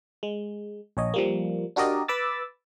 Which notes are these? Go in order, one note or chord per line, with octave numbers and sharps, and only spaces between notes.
G#3
A#1 C#5 D#5
F3 G3 A#3
D4 F#4 G4 A#4 D5 D#5
B4 B5 D6 E6 A6